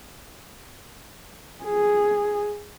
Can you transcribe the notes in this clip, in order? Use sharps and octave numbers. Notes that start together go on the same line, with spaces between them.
G#4